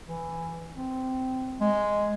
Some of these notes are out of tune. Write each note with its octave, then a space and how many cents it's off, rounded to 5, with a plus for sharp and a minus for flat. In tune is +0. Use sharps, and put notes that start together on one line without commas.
E3 +5
C4 -15
G#3 +0